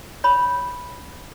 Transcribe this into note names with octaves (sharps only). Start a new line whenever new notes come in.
C#5 B5